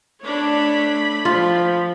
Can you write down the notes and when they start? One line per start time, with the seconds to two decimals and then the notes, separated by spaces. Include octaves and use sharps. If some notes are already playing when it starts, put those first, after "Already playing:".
0.21 A3 D4 C#5 B5
1.25 F3 F4